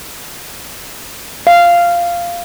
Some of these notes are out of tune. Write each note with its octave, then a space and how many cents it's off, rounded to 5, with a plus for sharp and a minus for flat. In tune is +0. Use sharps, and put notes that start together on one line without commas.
F5 -10